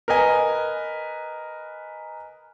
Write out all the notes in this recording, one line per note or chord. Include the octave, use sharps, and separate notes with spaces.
A#4 B4 D#5 G#5